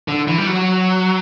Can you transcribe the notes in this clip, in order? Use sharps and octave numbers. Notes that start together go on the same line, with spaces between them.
D3
E3
G3
F#3